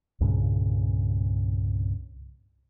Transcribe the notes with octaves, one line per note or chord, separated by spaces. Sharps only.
C2 G2 A#2 C#3